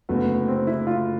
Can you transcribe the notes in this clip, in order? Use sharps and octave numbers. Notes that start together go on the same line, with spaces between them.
F#1 F#2 D3 F#3 A3 B3
C4
E4
F4